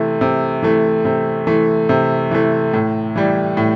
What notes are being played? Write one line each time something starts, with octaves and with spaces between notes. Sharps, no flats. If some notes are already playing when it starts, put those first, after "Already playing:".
Already playing: C3 E3 A3
C3
E3 A3
C3
E3 A3
C3
E3 A3
A2
E3 G3
A2